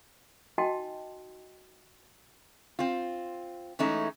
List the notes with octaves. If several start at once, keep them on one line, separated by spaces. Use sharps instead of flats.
D#4 F#4 D#5 G5 A5 C6
C4 F4
E3 G#3 A3 C#4 D#4